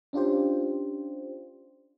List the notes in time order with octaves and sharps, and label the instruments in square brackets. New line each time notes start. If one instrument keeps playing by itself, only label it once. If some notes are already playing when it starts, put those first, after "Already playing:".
[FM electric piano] C#4 D4 F4 G4 C5